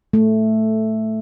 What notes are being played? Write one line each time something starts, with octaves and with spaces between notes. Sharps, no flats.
A3